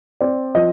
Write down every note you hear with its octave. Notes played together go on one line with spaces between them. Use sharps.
C4 D5
F3 D#5